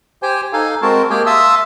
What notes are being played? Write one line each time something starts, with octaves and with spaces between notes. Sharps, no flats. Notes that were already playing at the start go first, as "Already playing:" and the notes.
G4 C5 G5 G#5
D#4 A4 F5 G#5
G#3 C4 F#4 A#4 A5
G#3 A#3 G4 G#4 G5 G#5
E5 F5 A5 C6 D#6 E6